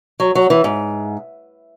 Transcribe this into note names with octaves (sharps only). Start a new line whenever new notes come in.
F#3
F#3
E3
G#2